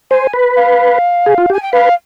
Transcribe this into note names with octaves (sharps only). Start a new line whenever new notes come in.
C5 G#5
B4
F5
G#4
F4
G4 G#5
G5
B4 F5